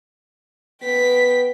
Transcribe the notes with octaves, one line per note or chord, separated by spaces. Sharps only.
B3 G5 B6